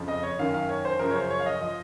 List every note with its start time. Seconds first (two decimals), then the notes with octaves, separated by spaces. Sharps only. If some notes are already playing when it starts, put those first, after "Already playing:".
Already playing: F2 C#3 F3
0.08 D#5
0.23 C#5
0.39 F#2 D#3 F5
0.54 F5
0.69 C#5
0.85 C5
0.99 F#2 C#3 F3 A#4
1.11 C#5
1.16 C5
1.30 C#5
1.40 F5
1.46 D#5
1.61 F3 D#5